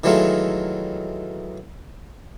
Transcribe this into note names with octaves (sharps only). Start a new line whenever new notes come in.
D#3 E3 F#3 G#3 A3 F4